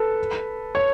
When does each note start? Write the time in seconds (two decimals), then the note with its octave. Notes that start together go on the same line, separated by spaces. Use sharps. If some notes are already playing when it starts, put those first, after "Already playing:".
Already playing: A4 B4
0.75 C#5